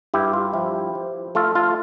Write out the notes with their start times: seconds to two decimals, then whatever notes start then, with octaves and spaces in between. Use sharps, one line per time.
0.14 G2 E4 G4
0.33 F4
0.54 F3 E4 G4
0.95 F3
1.35 A3 F4 A4
1.55 F4